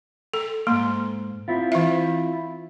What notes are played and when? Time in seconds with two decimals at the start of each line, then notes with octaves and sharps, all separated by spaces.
0.34 A4
0.67 G#2 A#3 C6
1.48 C4 E4 F4
1.72 E3 E5